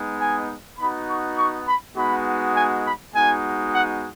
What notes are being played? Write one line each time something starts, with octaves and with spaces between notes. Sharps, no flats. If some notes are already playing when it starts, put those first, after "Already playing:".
Already playing: G#3 B3 D#4
G#5
B3 D#4 F#4 B5
C#6
C#6
B5
G#3 B3 D#4 F#4 B5
G#5
B5
G#3 B3 D#4 F#4 G#5
F#5